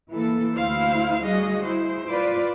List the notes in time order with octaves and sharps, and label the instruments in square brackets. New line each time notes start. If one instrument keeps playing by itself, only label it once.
[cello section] E3 A#3 A4
[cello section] D2 E4 [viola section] C5 F5
[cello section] G3 [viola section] F#4 G#4 D#5
[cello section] E4 [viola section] C5
[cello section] F4 B4 D5